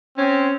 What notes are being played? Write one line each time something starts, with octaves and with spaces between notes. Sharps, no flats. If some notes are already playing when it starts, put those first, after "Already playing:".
C4 C#4